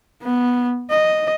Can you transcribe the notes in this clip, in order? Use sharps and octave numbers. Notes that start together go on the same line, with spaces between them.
B3
D#5